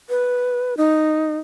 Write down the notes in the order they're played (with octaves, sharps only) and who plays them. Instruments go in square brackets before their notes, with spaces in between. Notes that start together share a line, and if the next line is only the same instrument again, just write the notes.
[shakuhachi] B4
D#4